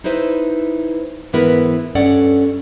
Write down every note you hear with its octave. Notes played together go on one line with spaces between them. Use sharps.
D#4 E4 B4 C5 E5
G#2 E3 B3 E4 A#4 B4
G2 C#4 A4 D5 F#5